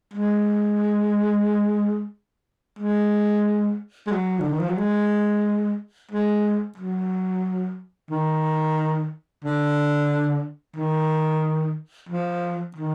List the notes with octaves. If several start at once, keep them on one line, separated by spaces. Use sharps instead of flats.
G#3
G#3
G#3
F#3
D3
D#3
F3
F#3
G#3
G#3
F#3
D#3
D3
D#3
F3
D#3